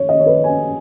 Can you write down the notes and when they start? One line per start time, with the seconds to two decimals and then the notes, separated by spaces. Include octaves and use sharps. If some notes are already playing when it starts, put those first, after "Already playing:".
Already playing: C#5
0.09 D#5
0.20 C#5
0.26 B4
0.44 G#5